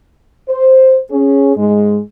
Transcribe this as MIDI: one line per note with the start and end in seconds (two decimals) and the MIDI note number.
0.49 0.99 72
1.10 1.52 61
1.10 1.52 68
1.57 1.99 44
1.57 1.99 56